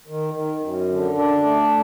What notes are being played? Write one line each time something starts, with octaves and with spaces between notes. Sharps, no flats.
D#3
D#3
F#2
D3
D4
A3